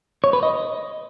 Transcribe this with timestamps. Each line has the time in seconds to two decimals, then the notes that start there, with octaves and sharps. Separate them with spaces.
0.24 C#5
0.33 B4
0.43 D#5